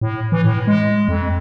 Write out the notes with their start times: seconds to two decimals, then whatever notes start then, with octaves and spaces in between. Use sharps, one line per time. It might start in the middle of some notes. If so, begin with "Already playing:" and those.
0.01 A2
0.32 E3
0.45 A2
0.67 G#3
1.09 F2